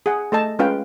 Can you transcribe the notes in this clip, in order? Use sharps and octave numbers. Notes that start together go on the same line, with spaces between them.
G#4 F#5
A3 A4 D#5 A5
G#3 C#4 F4 B4 F5 G5